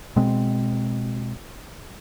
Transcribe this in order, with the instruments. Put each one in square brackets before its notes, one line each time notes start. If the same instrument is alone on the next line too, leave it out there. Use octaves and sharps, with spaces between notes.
[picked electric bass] B2 G#3 C4